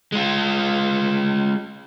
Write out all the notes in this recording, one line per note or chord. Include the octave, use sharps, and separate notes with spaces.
G#3 F4